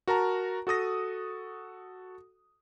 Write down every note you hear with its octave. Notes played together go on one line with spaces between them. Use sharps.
F#4 A#4 A5 A#5
F#4 A4 D#6 A#6